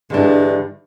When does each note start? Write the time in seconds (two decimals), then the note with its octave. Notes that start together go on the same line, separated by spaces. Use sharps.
0.10 G2 D3 E3 G#3 D4